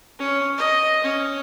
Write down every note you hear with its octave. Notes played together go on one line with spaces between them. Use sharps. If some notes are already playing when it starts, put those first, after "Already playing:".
C#4
D#5
C#4